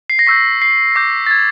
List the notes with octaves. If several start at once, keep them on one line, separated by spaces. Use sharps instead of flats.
C7
A#6
C#6 E6 G6 B6
C7
D6 G6 A#6
A6
G#6